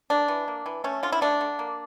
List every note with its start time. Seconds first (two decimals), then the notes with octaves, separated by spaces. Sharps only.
0.10 A#3 D4
0.28 E3
0.48 A#3
0.66 E3
0.84 A3 C#4
1.03 D3 F4
1.12 E4
1.21 A3 D4
1.41 D3
1.59 A#3